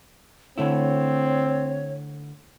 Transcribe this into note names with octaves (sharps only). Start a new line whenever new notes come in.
D3 A3 C4 E4 C#5